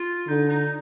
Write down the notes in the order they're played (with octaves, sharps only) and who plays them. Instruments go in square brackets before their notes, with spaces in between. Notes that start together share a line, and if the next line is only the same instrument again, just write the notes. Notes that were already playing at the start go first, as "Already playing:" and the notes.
Already playing: [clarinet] F4
[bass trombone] D3 [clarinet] D#4
[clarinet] D#4